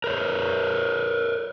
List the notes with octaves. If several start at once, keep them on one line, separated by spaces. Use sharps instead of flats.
A#4 B4 C#5